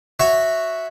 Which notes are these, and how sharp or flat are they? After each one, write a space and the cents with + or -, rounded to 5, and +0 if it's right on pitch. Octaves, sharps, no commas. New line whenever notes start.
F#4 +0 C#5 +0 E5 -5